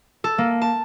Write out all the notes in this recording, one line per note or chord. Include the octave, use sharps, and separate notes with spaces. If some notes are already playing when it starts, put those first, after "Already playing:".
A4
A#3
A5